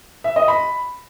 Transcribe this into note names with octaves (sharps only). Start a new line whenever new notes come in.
E5
D#5
B5